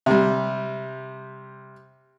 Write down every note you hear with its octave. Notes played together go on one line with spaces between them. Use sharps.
C3 G3